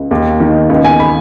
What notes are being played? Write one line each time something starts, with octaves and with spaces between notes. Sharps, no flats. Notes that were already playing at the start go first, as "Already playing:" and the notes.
Already playing: C#2
D#2
D#3
C#2
G#5
B5